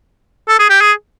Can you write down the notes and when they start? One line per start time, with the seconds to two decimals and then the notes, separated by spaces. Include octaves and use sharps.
0.49 A4
0.59 G#4
0.70 G4
0.81 G#4